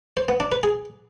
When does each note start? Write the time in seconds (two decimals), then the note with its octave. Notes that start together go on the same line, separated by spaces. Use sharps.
0.17 C5
0.28 B3
0.40 D4
0.52 B4
0.63 G#4